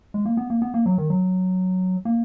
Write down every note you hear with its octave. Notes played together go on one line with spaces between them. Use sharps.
G#3
A#3
B3
A#3
B3
A#3
F#3
D#3
F#3
A#3